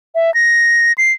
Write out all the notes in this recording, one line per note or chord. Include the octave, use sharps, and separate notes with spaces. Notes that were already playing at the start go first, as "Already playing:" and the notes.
E5
A#6
C7